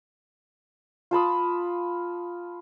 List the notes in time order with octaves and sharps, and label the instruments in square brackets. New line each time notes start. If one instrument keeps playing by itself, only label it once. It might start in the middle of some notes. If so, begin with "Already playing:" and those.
[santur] F4 A5 B5 D#6